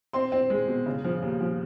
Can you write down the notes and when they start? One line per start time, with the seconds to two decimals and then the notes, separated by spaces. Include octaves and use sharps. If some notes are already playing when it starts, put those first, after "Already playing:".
0.13 C4 C6
0.32 C4
0.50 G#3
0.68 B2
0.86 C#3
1.04 F3
1.22 D#2
1.41 F3